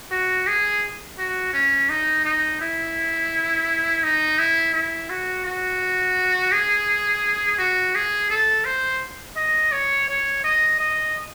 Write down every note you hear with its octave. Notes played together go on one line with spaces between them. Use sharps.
F#4
G#4
F#4
C#4
D#4
D#4
E4
D#4
E4
E4
F#4
F#4
G#4
F#4
G#4
A4
C5
D#5
C#5
C#5
D#5
D#5